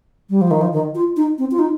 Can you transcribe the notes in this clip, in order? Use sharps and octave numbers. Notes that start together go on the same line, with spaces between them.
G3
F3
D#3
F3
D#3
F4
D#4
C4
F4
D#4